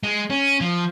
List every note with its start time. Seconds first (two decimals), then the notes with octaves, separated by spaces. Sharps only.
0.03 G#3
0.30 C#4
0.61 F3